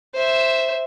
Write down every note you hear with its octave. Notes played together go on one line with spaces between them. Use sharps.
C5 E5